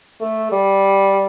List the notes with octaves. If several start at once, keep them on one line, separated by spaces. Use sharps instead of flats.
A3
G3